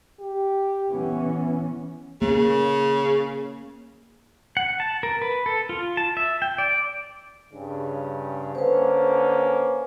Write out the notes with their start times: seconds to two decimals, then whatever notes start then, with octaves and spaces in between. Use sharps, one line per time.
0.20 G4
0.92 E3 B3 C#4
2.22 C#3 A#3
4.57 F#5
4.80 A5
5.03 A#4
5.22 B4
5.46 A4
5.69 F4
5.97 A5
6.17 E5
6.42 G5
6.58 D5
7.53 G2 C#3
8.55 D3 A#3 C#4 B4 C5